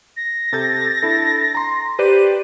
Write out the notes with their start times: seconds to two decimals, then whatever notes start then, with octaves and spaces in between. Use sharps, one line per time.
0.17 A#6
0.52 C3 A4 G6 A6
1.02 D4 E4 A4
1.55 A#5 C6
1.99 G4 B4 C5 D5 D#7